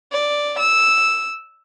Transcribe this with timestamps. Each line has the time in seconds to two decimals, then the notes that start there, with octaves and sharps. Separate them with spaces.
0.12 D5
0.59 E6